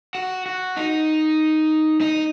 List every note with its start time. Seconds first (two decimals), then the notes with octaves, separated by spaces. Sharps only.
0.15 F#4
0.46 F#4
0.77 D#4
2.01 D#4